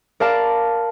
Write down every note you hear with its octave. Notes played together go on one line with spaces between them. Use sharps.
A#4 D5 F5 A5 B5